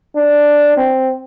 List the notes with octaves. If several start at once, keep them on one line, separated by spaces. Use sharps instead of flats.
D4
C4